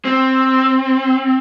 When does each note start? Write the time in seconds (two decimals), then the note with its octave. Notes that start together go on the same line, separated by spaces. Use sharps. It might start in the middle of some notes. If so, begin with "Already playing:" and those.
0.05 C4